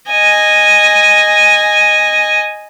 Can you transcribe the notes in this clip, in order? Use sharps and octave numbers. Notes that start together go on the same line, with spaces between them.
D#5 G#5